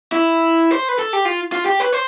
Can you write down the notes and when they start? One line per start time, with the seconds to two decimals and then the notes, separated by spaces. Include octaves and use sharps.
0.12 E4
0.72 C5
0.89 B4
0.99 A4
1.13 G4
1.25 F4
1.52 F4
1.66 G4
1.80 B4
1.93 C5